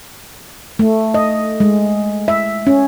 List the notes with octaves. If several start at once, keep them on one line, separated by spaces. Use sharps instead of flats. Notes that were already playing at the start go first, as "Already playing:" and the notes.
A3
D#5
G#3
E5
C#4